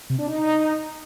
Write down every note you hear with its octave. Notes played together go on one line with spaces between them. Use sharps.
C3
D4
D#4